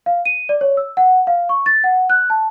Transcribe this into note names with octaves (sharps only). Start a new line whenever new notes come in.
F5
D#7
D5
C#5
E6
F#5
F5
C#6
A6
F#5
F#6
A5